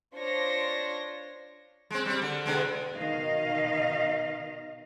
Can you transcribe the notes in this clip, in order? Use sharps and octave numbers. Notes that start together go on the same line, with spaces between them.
D4 F4 C5 C#5 A#6
G#3 C4
G3 C4
D3
B2 D3 G#3
B2 D#3 D#5 F5